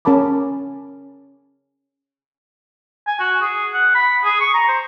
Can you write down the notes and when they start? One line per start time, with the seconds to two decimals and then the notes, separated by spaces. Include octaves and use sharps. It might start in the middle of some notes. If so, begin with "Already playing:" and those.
0.05 C#4 A#4 A5 B5 D6
3.07 G#5
3.19 F#4
3.41 G#4
3.73 F#5
3.95 B5
4.24 G#4
4.40 C#6
4.54 A#5
4.68 C5